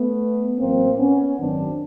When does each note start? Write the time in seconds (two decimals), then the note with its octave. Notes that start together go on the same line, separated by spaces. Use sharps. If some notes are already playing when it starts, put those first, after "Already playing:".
Already playing: A3 B3
0.59 A1 A2 F#3 A#3 C4
0.98 B3 C#4
1.37 G#1 F#2 D#3 F#3 C4 D4